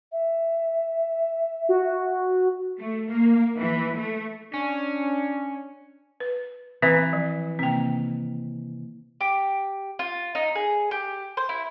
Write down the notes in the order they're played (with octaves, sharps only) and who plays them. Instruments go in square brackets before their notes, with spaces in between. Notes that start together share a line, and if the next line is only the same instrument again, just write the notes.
[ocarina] E5
[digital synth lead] F#4
[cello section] A3
A#3
E3
A3
[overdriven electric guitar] C#4 [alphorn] D4
[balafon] B4
[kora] E3 [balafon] C4 B4
[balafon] F3
[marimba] C3 D#3 A#3 [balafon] C4 G5
[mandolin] G4
F4
D#4
G#4
G4
C5
E4